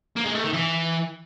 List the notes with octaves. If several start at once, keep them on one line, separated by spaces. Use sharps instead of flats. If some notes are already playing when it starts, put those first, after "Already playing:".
A#3
G#3
A3
D#3
E3